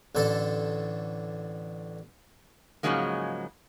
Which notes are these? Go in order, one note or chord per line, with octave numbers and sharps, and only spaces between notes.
A1 D3 A4
G#2 C#3 F3 F#3 G#3 A#3